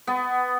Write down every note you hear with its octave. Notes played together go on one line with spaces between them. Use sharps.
B3